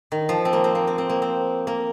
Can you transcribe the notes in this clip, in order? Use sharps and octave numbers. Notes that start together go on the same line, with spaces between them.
D#3
F3
C4
A#3
C4
A#3
C4
C4
A#3
C4
A#3